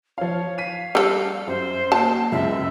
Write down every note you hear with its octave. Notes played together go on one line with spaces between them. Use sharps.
F3 C#5 F5
F5 B6 D#7
G3 A4
F#2 C5
A#3 F#4 A5
C#2 F#2 C#3 E5